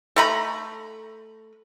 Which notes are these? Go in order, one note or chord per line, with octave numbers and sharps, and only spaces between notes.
A3 A#5 B5